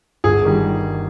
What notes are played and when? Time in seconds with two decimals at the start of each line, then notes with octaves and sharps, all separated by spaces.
0.24 G1 G#4
0.45 D#3 G3